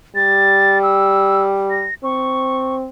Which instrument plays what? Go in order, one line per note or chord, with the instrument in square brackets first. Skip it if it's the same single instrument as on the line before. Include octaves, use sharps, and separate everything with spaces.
[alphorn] G3 [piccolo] A6
[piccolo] E6
A#6
[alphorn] C4 [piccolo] C#6